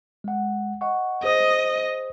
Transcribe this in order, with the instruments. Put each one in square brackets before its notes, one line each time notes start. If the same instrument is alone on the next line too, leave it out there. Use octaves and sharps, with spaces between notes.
[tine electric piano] G#3 F#5
D#5 F#5 C#6
[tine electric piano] G#4 C5 D#6 [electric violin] D#5